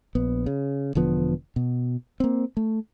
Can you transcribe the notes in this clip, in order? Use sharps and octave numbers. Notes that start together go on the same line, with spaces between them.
A#1 B3
C#3
E1 D3 F3 B3
B2
A#3 C4
A3